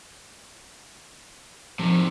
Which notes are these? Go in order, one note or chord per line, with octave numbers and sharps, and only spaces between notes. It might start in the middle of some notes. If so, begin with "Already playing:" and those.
C3 D#3 F3